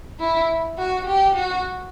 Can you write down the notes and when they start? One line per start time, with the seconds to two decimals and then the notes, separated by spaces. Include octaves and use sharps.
0.20 E4
0.78 F#4
1.06 G4
1.35 F#4